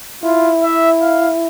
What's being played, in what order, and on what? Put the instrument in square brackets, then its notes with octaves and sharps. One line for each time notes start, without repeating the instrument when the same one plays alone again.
[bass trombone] E4 [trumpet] F4
[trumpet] E5
F5